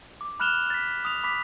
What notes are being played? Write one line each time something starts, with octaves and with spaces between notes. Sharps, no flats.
D6
B5 F6 F#6 E7 F7 G7
A6 B6
D#6 F7
B5 D6 B6